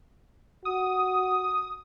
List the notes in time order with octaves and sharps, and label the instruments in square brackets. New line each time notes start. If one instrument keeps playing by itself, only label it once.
[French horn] F#4 [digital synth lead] D#6